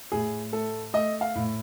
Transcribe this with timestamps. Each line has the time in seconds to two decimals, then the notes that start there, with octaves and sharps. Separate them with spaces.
0.12 A2 G#4
0.53 A3 A4
0.93 A3 D#5
1.21 F5
1.35 A2